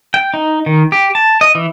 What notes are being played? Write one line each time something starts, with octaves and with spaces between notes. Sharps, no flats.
G5
D#4
D#3
G4
A5
D#5
E3